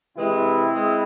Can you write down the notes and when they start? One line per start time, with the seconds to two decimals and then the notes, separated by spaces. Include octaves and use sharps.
0.17 C3 E3 G#3 C4 E4
0.74 G#3